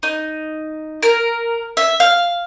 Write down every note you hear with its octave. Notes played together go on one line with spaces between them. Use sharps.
D#4
A#4
E5
F5